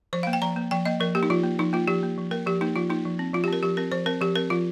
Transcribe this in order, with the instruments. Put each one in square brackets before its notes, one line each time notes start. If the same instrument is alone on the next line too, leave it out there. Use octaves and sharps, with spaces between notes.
[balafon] F3 C5
F5
A#3
G5
F3 A#5
A#3
F3 G5
A#3 D#5
F3 A#4
A#3 G4
D#4
F3 F4
A#3
F3 D#4
A#3 F4
F3 G4
A#3
F3
A#3 A#4
F3 G4
A#3 D#4
F3 F4
A#3 D#4
F3
C4
F3 F4
G4
C4 A#4
F3 G4
C4 A#4
F3 C5
C4 A#4
F3 G4
C4 A#4
F3 F4